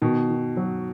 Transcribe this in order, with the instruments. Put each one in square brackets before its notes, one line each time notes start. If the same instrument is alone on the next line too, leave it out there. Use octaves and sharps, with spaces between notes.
[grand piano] B2 [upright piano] D#3
[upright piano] D#3
F#3